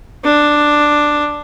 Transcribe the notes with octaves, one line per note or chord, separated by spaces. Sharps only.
D4